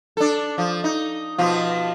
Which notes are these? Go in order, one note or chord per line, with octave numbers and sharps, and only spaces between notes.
D4 A4
F3
D#4
B2 F3 F4